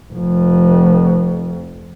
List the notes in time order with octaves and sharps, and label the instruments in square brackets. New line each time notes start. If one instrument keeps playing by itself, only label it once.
[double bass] F1 F2